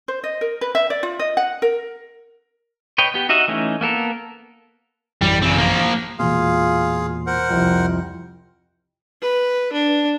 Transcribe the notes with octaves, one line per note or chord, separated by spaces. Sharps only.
C5
D#5
A#4
B4
E5
D5
F4
D#5
F#5
A#4
B4 C#5 D#5 G5
B3 G4
D#4 F#4 D#5 E5 F#5
E3 A3 C#4 D#4
A#3 B3 A4 A#4
A1 F#2 E3 G3
C#3 C4
F3 A#3
E1 A#2 F4 G#4 F5
A#4 C5 F#5
C2 F2
B4
D4